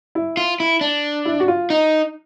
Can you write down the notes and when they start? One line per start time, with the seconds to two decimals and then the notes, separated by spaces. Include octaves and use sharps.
0.15 E4
0.37 F4
0.60 E4
0.81 D4
1.25 E4
1.40 F#4
1.48 F4
1.70 D#4